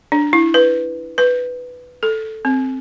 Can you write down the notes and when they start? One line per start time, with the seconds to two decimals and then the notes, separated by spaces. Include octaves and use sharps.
0.12 D4
0.33 E4
0.54 B4
1.18 B4
2.03 A4
2.45 C4